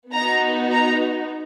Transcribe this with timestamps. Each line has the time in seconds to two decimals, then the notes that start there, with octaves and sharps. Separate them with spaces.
0.13 B3 D#4 F#4 A#5
0.71 A#5